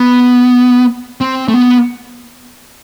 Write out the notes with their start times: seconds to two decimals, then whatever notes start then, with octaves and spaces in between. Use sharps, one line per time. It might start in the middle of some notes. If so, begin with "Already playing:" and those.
Already playing: B3
1.21 C4
1.48 A3
1.54 B3